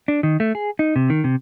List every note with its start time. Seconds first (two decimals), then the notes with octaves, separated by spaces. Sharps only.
0.08 D4
0.23 D#3
0.40 A3
0.55 G#4
0.79 D#4
0.96 C3
1.10 D#3
1.24 C3